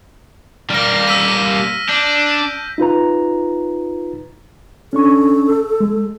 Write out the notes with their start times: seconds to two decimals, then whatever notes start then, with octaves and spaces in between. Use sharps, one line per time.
0.70 G3 A#3 F6 A#6
1.07 E6 B6 D#7
1.89 D4 G6
2.78 D#4 F4 B4 A#5
4.93 C#4 D4 A4 C#6
5.80 G#3